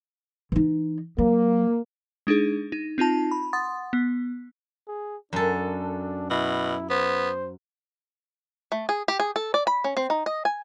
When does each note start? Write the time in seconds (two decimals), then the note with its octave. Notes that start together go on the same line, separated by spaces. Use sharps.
0.52 E3 D#4
1.18 F#3 A#3
2.27 G#3 D4 D#4 G#4
2.72 D#4
2.98 C4 D#4 F4 A5
3.31 B5
3.53 F#5 C6 D#6 A6
3.93 B3
4.88 G#4
5.33 F#2 D4 A4
6.30 B2 E4
6.90 B3 C5
8.72 A3
8.89 G#4
9.08 G4
9.20 G#4
9.36 A4
9.54 D5
9.67 B5
9.84 C#4
9.97 C4
10.10 D#4
10.26 D#5
10.45 G#5